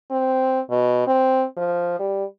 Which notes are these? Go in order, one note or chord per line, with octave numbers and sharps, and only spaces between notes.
C4
B2
C4
F3
G3